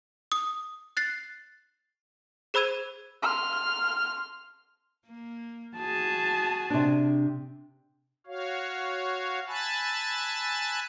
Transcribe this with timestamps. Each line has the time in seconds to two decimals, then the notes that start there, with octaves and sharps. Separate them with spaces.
0.32 D#6
0.97 F#6 A6 C7
2.54 G#4 C5 B5 E6 G#6 D#7
3.23 C6 F6
5.06 A#3
5.77 F#4 G#4 A5
6.70 C3 D4
8.27 F#4 C#5 F5
9.48 G#5 A5 B5 E6 F#6 A6